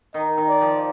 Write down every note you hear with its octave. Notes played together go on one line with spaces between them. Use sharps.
D#3 D#5
D#3
D5
F3